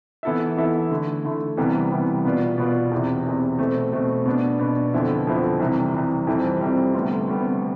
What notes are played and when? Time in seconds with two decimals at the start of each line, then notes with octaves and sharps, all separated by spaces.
0.23 E3 B3 E4 A4 E5
0.57 E3 B3 E4 A4 E5
0.90 D3 A3 E4
1.25 D3 A3 E4
1.57 C2 C3 E3 G3 B3
1.91 C2 C3 E3 G3 B3
2.25 B2 B3 F4 B4 D5
2.58 B2 B3 F4 B4 D5
2.91 E2 C3 E3
3.25 E2 C3 E3
3.59 B2 A3 C4
3.93 B2 A3 C4
4.26 B2 B3 D4
4.59 B2 B3 D4
4.94 F2 D3 F3 B3 E4
5.27 F2 D3 F3 B3 E4
5.60 C2 C3 E3
5.94 C2 C3 E3
6.27 F2 C3 E3 G3 C4
6.61 F2 C3 E3 G3 C4
6.95 D2 C3 G3 B3
7.28 D2 C3 G3 B3